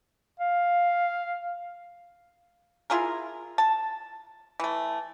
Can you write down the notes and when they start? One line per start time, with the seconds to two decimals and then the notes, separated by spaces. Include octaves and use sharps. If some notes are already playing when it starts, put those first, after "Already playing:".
0.40 F5
2.90 E4 F4 G#4 A#4
3.58 A5
4.60 E3 A3